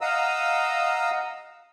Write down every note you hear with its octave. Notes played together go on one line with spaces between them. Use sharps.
D#5 F5 F#5 A#5 D#6 E6